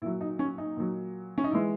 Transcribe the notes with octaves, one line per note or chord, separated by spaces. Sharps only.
A#2 F#3 E4
D#4
C#4
D#4
A#2 F#3
C#4
D#4
E3 G#3 E4